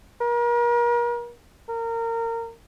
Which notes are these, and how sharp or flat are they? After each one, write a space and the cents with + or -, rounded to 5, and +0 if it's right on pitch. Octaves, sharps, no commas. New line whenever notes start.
A#4 +40
A#4 -25